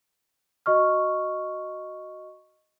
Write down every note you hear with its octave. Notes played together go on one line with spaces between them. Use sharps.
F#4 D#5 C#6 F6